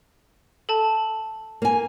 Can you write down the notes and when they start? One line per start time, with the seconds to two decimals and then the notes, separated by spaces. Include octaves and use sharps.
0.69 A4 A5
1.62 A#3 G#5